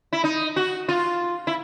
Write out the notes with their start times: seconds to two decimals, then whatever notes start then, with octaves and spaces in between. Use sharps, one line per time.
0.13 E4
0.24 D#4
0.56 F#4
0.89 F4
1.47 E4